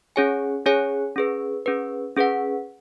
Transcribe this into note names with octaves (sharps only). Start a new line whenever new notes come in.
C#4 G#4 C#5 G#5
C#4 G#4 C#5 G#5
C#4 G#4 B4
C#4 G#4 B4
C#4 G#4 B4 F#5